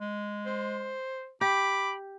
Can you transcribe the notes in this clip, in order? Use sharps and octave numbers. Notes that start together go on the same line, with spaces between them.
G#3
C5
G4 B5 D6